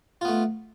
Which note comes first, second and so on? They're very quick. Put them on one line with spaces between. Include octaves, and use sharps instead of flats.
F4 B3 A3